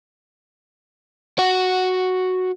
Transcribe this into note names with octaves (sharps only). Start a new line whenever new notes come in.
F#4 F#5